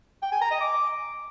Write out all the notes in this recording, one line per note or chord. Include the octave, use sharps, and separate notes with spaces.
G5
G#5
A#5
D#5
D6